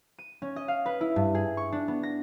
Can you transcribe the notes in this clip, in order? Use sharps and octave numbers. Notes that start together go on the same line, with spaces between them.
D#7
C#4
D#5
F5
B4
E4
G2
G#4
C#6
D4
B3
A#6